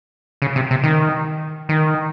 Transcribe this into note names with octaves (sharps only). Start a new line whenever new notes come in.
C#3
C3
C3
D#3
D#3